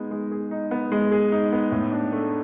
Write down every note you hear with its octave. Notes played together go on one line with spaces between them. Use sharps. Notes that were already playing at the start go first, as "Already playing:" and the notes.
Already playing: G#3 B3 D#4 G#4
G#3
G#4
D#4
B3
G#3
G#4
D#4
B3
A2
D4
A3